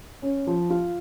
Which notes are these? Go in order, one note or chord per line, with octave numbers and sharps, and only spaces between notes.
C#4
F3
F4